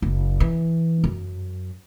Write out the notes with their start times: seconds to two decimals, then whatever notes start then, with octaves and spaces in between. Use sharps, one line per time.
0.02 F#1
0.40 E3
1.04 F#2